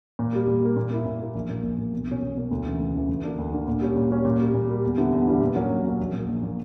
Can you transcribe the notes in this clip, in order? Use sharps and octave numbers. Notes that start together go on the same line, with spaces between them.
A#2
G3 A#3
A#2
G3 A#3
A#2
A#3 E4
A#2
A#3 E4
A#1
A#2 A#3
A#1
A#2 A#3
B1
B2 A#3 C#4
B1
B2 A#3 C#4
D2
C#3 E3
D2
C#3 E3
D2
D3 A#3 D4
D2
D3 A#3 D4
A#2
G3 C#4
A#2
G3 C#4
A#2
G3 A#3
A#2
G3 A#3
E2
D3 G3 B3 E4
E2
D3 G3 B3 E4
A#2
F#3 A#3 C#4
A#2
F#3 A#3 C#4
A#1
A#2 A#3
A#1
A#2 A#3